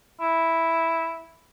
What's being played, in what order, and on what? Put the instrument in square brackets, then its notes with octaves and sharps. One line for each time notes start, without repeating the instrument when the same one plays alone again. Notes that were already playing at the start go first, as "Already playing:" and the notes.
[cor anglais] E4